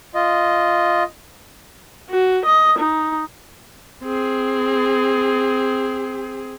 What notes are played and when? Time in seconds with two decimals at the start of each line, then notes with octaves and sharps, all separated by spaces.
0.15 F4 D#5
2.10 F#4
2.45 D#5
2.79 D#4
4.03 C4 G#4